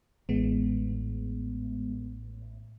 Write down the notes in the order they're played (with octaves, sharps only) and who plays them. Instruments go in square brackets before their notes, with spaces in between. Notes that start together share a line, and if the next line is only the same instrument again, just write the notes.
[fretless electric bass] A1 [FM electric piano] G#3 B3